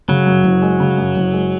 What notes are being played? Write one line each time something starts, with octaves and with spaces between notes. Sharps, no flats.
C#3 F#3
F#2
F#1
G#3
C#3
F#2
F#1
G#3